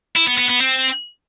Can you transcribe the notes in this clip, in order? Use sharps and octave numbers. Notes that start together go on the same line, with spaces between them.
E4
B3
B3
B3
C4